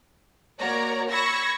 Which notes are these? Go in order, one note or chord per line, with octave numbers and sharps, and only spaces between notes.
A#3 F#4 A#4 C#5 D5 A#5
B5 C#6 E6 G#6 A#6